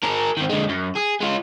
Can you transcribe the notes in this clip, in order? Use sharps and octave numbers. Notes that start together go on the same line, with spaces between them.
G#4 A#4
D#3 C4
D3 G#3
F#2
G#4
G#3 F4